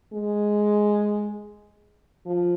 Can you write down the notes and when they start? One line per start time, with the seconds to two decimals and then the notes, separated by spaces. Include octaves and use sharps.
0.14 G#3
2.26 F3